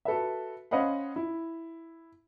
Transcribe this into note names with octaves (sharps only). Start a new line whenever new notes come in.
F#4 A4 B4 E5
C#4 C5 D#5 F5 F#5 B5
E4